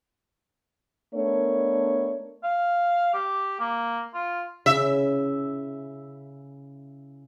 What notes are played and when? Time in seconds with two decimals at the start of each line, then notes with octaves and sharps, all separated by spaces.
1.15 A3 B3 D4 A#4 C#5
2.44 F5
3.13 G4
3.60 A#3
4.14 F4
4.66 C#3 E4 E5